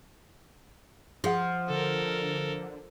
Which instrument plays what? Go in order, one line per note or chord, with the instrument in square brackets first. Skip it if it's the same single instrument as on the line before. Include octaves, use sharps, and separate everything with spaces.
[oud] F3 [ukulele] G#4 F#5
[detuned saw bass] D3 [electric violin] A4 A#4